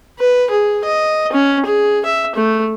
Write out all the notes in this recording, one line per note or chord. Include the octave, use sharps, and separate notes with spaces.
B4
G#4
D#5
C#4
G#4
E5
A3